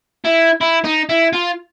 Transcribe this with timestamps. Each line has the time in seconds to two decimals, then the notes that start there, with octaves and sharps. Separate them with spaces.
0.24 E4
0.61 E4
0.84 D#4
1.09 E4
1.33 F4